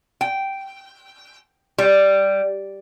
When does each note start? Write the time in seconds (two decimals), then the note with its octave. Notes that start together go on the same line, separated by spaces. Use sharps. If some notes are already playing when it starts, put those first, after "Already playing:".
0.21 G5
1.78 G3